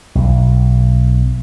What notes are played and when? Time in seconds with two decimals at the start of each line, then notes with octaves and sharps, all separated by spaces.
0.15 B1